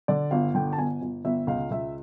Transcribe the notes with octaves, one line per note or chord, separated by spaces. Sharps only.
D3 D5
G1 F5
D3 G5
A5
G1 G#5
G1
G1 E5
C#2 F5
C#2 E5